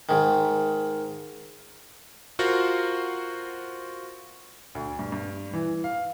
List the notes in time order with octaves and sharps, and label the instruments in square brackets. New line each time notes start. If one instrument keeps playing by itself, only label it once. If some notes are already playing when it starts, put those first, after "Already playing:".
[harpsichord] G#2 D#3
[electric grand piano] F4 F#4 A#4 C5 F#5
[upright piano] D2
G2
G2
E3
F5